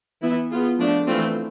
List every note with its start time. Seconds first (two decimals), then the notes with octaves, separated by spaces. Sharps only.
0.22 E3 B3 E4
0.51 B3 F4 G#4
0.79 F3 A3 D4
1.08 E3 A3 C4 F4